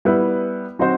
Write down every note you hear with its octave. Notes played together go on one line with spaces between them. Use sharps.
G3 B3 E4 B4
F#3 C4 D#4 F#4 C5